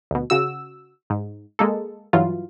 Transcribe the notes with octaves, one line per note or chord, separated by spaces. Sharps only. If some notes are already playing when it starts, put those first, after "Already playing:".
D2 B2
C#3 F#4 E6
G#2
G#3 A#3 A4
G2 E3 F#3 F4